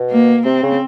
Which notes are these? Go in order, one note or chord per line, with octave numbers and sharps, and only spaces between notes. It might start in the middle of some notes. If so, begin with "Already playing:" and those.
Already playing: B2
A#3
C3 C4
C#3